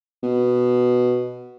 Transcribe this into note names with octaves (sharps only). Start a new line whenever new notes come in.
B2